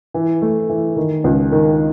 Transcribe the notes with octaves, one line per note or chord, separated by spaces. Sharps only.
E3
A3
E3
D#3
C#2
D#3